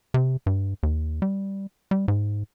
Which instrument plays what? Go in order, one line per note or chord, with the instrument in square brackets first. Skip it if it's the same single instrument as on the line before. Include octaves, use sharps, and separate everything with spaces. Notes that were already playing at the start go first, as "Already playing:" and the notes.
[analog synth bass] C3
G2
D#2
G3
G3
G#2